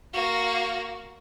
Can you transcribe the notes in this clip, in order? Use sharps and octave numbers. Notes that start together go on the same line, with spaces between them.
A#3 F#4